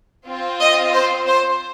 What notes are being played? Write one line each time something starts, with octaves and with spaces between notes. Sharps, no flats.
C4 F4
D#5
C5
C5